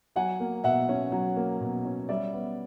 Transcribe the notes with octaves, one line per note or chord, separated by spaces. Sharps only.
F#3 F#5 G#5
A#3
B2 E5 F#5
C#4
F#3
A#3
B2
C#4
G3 D5 E5
B3